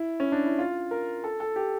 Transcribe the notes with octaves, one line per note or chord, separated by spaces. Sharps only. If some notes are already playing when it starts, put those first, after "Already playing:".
Already playing: E4
C#4
D4
E4
F4
A#4
A4
A4
G4